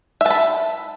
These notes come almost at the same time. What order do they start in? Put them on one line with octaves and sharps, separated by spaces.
E5 A5 B5